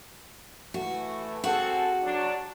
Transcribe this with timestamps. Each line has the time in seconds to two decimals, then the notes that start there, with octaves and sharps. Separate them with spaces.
0.74 E3 A3 F#4
1.44 C4 F#4 G#4 A4 F#5
2.03 F#3 D4